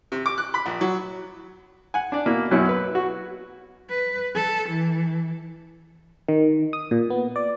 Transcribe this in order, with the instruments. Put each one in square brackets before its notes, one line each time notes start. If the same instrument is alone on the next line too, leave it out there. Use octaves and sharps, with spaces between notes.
[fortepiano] C3
D6
F#6
B5
A#1
F#3
F#5 G#5
D4 D5
B2 A#3 E4
F#2 B2 F#3 C#4 E4
B4
F#4
[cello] B4
A4
E3
[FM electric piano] D#3
D#6
A#2
B3
D5